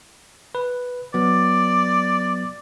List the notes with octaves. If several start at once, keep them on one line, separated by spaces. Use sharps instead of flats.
B4
F#3 B3 D5